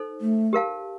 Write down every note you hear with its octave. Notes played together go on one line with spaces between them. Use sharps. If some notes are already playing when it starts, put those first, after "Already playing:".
Already playing: D#4 A4 C5
A3
G4 A#4 F5 A5